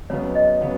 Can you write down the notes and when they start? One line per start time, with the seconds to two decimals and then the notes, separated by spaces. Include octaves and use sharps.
0.10 C#2 C#3 F#3 B3 C#5
0.35 D#5
0.61 C#3 F#3 B3